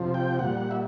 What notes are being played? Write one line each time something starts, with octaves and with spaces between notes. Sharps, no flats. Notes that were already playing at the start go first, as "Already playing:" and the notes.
Already playing: F2 C3 F3
G5
A#2 G3 F#5
E5